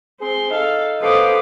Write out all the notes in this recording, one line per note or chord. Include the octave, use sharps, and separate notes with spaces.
C4 G#4 C6
D#4 A4 F5
B3 A4 B4 C5 F5 D6 D#6